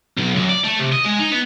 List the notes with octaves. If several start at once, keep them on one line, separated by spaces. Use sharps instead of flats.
B1
F#2
D5
A3
C3
D#5
G#3
D#4
B3